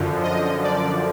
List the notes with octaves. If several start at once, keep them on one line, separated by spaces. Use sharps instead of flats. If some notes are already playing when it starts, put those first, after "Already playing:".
Already playing: F#2 D3 F3
D#5
D5